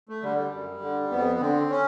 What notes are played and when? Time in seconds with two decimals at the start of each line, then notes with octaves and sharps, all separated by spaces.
0.09 A3
0.23 D3 G3
0.38 G3
0.52 F#2
0.82 D3
1.11 F2 B3
1.40 D3 C4
1.70 C#4